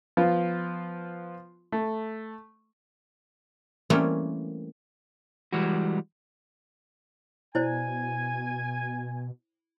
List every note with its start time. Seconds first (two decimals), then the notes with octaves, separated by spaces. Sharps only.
0.17 F3 B3 F4
1.72 A3
3.90 E3 G3 A3 A#3 C4 C#4
5.53 E3 G3 G#3 F#4
7.55 B2 E4 C5 D5 G#5